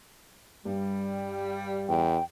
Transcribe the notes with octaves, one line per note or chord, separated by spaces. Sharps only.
G2 G3
E2 G5